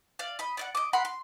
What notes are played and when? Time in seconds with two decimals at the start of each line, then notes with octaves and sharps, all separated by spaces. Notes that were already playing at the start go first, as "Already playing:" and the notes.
0.19 D5 F5
0.39 D#5 B5
0.57 D5 D#5 F#5
0.75 D#5 D6
0.93 A#4 F#5 B5 C6
1.05 C6